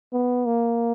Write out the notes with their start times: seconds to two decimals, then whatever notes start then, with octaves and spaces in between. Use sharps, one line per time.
0.13 B3
0.46 A#3